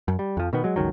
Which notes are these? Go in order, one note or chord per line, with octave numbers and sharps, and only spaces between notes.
F#2
G3
F2 F3
B2 D#3 B3
F#3 G#3
G1 C#2 D#3 F#3